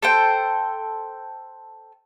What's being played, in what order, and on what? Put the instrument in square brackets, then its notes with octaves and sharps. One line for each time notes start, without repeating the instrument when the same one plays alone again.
[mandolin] A4 C5 G5